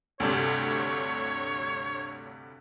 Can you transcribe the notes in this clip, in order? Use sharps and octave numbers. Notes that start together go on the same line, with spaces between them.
D2 G2 C3 C#5